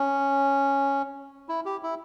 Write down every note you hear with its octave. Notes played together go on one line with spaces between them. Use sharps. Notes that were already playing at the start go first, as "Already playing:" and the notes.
Already playing: C#4
E4
G4
E4